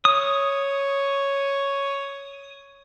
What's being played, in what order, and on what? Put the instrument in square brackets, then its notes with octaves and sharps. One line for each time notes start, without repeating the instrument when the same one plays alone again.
[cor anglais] C#5 [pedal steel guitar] D#6